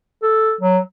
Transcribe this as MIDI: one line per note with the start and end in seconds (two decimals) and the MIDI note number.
0.23 0.54 69
0.61 0.79 54